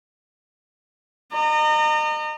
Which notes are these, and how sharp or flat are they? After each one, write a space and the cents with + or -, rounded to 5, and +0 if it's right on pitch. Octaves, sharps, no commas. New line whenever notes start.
D#5 -35 A#5 -30